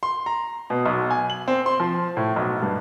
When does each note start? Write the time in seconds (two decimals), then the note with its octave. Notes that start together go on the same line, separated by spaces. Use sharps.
0.03 C6
0.26 A#5
0.70 B2
0.86 B1
1.11 G#5
1.30 F#7
1.48 C4
1.66 C6
1.80 F3
2.17 A2
2.36 B1
2.62 G2